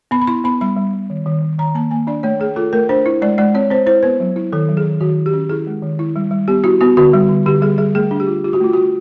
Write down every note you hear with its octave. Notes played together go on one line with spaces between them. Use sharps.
B3 B5
B5
E4 C6
B3 B5
G3 B5
G3
G3
D#3
D#3
D#3
D#3 A#5
A#3 A5
A#3 G#5
D4 D5
A3 C#5
A3 G#4
F4 A4
A3 A#4
D4 C5
E4
G#3 D5
G#3 D5
C4 C#5
C4 C5
E4 C5
B3 B4
F#3
E4
D#3 A4
F#3
G#4
D#3
D#3 F#4
E4
G4
C#4
E4 G#4
G#3
D#3
E4
G3
G3
B3 G4
E4 F#4
B3 F#4
D3 F#4
G3
D3
D3 G4
G3 G#4
G3 G#4
A3 G#4
D4
G4
F4
F4 G4
F#4
A3 F4
F#4
F4